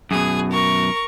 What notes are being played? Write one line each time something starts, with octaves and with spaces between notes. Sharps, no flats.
F#2 B2 G#4
A#4 C#6